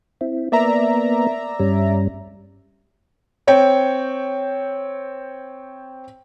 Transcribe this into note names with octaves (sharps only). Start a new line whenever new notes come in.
C4 E4
A#3 B3 D5 E5 A#5
G2 G3 C#4
C4 C#5 G5